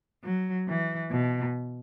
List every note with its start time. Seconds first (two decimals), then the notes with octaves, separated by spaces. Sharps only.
0.23 F#3
0.67 E3
1.10 B2